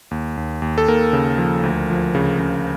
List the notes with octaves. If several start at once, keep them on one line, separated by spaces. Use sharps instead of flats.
D#2
D#2
D#2
A4
D#2 A#4
C#3
F3
D2
F3
C#3
C#3